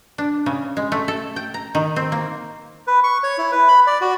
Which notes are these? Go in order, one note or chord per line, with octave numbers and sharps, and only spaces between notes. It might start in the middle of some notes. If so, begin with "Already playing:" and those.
D4
C#3
G#3
A3
A4
G5
A#5
D#3
C4
A#3
B4
C#6
C#5
E4
B4
B5
D5
F#4